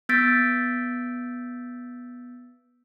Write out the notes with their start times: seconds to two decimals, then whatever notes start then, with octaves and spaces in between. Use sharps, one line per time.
0.09 B3 E6 G6 A6 B6 D7